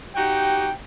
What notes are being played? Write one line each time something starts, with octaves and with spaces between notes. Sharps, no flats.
D#4 F#4 G4 G5